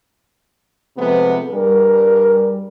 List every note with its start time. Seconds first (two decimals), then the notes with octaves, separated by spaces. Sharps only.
0.97 C3 F3 G#3 A3 B3
1.49 G2 G3 G#4 A#4